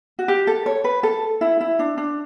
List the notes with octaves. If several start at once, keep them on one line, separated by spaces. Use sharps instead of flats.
F#4
G4
A4
C#5
B4
A4
E4
E4
D4
D4